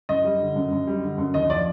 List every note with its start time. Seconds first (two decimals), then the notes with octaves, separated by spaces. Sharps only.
0.09 F#2 D#5
0.25 G3
0.40 D3
0.56 F#2
0.72 F#2
0.87 G3
1.03 D3
1.18 F#2
1.34 D#2 D#5
1.50 F3 D5